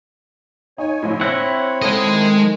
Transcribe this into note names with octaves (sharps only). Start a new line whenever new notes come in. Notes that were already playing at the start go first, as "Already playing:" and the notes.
D#4 C#5 G#5
A#1 A2
C4 E4 C#5 F#5 E6 A#6
G#3 A4 D#5 G#6
D#3